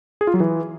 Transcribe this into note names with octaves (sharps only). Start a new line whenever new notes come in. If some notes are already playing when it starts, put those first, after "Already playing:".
G#4
F4
F#3
E3